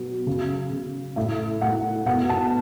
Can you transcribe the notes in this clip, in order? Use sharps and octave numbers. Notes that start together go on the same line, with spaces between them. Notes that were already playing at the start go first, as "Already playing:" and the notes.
Already playing: B2 F#3
C#3
C#3
A2 E5
A2 F#5
B2 F#5
A5